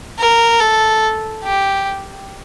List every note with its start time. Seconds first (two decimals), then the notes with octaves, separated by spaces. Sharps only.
0.19 A#4
0.60 A4
1.43 G4